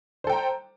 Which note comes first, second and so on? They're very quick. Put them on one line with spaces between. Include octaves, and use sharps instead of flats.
C5 A4 G5 A#5